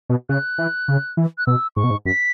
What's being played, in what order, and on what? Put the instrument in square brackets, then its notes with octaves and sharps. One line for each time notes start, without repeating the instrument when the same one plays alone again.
[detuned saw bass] B2
[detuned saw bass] C#3 [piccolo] F#6
[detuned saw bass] E3
C#3
E3
[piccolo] F#6
[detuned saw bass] B2 [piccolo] E6
[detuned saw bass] G#2 [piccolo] C#6
[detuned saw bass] B2
G#2
[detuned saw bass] F#2 [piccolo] B6